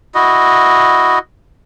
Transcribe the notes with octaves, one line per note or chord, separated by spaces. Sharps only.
E4 F#4 D#5